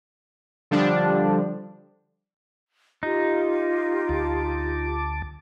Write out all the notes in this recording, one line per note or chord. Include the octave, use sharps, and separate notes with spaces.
D3 F3 G3 D4
D#4 F4 G4
D2 A5 D6